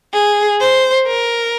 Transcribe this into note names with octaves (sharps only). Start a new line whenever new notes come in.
G#4
C5
A#4